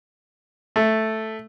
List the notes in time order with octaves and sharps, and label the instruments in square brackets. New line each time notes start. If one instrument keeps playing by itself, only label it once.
[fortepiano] A3